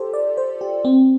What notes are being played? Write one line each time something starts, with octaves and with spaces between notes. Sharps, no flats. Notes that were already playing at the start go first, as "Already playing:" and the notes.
Already playing: F4 G4 A4 C5
D5
C5
G4
C4